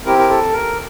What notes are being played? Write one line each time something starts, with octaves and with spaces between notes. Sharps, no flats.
C4 E4 G4 A#4
A#4
A4
A#4